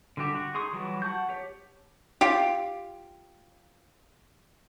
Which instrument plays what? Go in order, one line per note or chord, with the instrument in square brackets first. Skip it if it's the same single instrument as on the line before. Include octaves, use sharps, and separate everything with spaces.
[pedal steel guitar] D3 G3 F#4 G4 E5
F#4
D#4 G#4 C6 C#6 D#6
E3 F#3 G3 F4 F#4
F#5 A5 C#6 G6
G4 C#5
[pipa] F4 G4